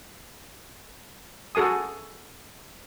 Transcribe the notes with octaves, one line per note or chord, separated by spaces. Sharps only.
F#4 G#4 A4 G#5 D#6